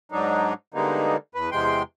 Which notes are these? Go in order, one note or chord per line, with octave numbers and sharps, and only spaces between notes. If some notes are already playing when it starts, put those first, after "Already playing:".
G#2 F#3 D4 D#4
D3 G3 G#3 A#3 B3 D#4
E2 B4
E2 C3 G#3 G5 C6